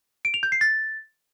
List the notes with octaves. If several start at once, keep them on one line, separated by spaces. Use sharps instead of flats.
D7
F7
G6
C7
A6